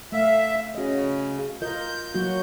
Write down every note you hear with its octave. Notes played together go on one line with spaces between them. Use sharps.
A3 E5 F5
C#3 F#4 D#5
F4 A#4 D#5 G6
F#3 A#3 F#4